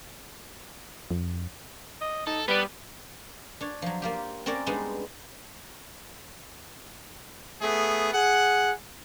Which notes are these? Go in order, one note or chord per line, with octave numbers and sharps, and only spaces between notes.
F2
D#5
D#4 A4
G3 B3 B4 D5
D4 C#5
F3 F#3
A#3 F4 G4
C4 C#4 A#4 D5 F#5
G3 G#3 B3 C4 D4 D#4
A3 B3 G#4
G#4 F#5